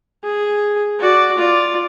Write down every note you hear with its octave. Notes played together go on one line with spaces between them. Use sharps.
G#4
F#4 D5
F4 D5